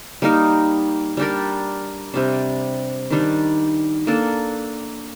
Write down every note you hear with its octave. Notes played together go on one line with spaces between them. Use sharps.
G3 A#3 D#4 A#4
G3 D4 G4 A#4
C3 G3 D4
D#3 G3 D4
A#3 D4 A4